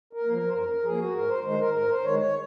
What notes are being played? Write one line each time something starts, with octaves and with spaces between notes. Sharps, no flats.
A#4
A#3
F3
A#4
C5
F#2 A#4
A#4
F3 A#3 G#4
F#4
G#2 A#4
C5
D#3 G#3 C5
A#4
G#2 A#4
C5
D#3 G#3 C#5
C#5